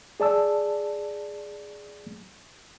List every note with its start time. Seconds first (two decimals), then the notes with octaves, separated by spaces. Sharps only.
0.20 G#4 D5 A5 E6